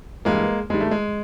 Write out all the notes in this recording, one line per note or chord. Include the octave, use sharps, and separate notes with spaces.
G2 E3 G3 G#3 A#3
G2 D#3 G3 G#3
A3
G#3